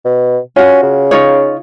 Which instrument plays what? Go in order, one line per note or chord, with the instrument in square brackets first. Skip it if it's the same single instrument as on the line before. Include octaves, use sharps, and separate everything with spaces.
[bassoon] B2
[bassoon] C#4 [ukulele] F4 F#4
[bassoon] C#3
[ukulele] D#4 F4 C#5